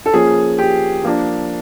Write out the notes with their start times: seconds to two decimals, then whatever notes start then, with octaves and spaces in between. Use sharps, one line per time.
0.06 A4
0.13 F3 A#3 C#4 G#4
0.58 G4
1.03 F3 A#3 D4